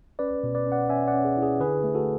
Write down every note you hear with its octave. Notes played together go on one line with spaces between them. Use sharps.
C#4 B4 D5
B2
B4 D5
C#4
D5 F#5
C#4 E5 G#5
D5 F#5
C#4
G#4
E4
G#4
D3 G#4 B4
A3
F#4 A4